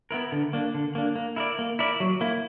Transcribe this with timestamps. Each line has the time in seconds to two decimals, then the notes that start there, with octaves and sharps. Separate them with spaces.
0.11 B3 E4 A#4
0.32 D3
0.53 A#3 D4
0.74 D3
0.95 A#3 D4
1.16 A#3
1.36 E4 A#4 D5
1.59 A#3
1.79 E4 A#4 D5
2.00 F#3
2.21 A#3 E4